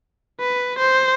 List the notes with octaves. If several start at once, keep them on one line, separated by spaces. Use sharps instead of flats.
B4
C5